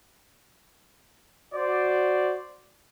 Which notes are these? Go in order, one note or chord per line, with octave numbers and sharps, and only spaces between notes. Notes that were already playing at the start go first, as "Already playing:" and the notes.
F#4 C5 D5